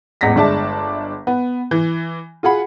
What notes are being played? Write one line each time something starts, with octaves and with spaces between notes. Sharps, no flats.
A1 E2 G#3 A#6 B6
G1 G#3 D4 E5 A5
B3
E3
F4 F#4 G#4 F#5 B5